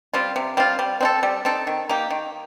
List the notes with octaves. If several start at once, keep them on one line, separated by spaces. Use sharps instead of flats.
G3 C4 F4
C3
G3 C4 F4
G3
C4 D#4 A4
G3
C4 D#4 A4
D#3
A#3 D#4 G4
D#3